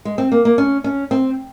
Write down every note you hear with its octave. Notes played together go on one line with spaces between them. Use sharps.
G#3
C4
A#3
A#3
C#4
C#4
C4